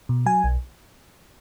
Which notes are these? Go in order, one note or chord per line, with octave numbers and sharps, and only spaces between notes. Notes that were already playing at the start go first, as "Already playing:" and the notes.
B2
F#3 G#5
B1